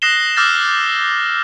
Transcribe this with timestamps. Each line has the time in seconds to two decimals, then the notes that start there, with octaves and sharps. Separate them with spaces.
0.02 D#6 F#6 A#6 C7 E7 G7
0.37 D6 E6 F6 G6 A6